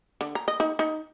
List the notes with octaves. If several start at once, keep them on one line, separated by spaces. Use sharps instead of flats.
D3
A#5
D#5
D#4
D#4